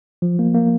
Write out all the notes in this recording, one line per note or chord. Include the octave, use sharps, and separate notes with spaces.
F3
A#3
A#3